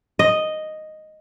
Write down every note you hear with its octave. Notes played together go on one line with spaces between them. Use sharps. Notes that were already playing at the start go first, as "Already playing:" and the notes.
D#5